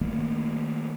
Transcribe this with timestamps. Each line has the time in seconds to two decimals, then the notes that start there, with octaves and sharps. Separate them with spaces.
0.01 D#3 G3 A3 A#3